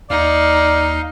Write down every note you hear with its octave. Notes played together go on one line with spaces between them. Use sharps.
D#2 D#4 D5 F5